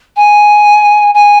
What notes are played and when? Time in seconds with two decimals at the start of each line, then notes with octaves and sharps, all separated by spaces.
0.16 G#5
1.14 G#5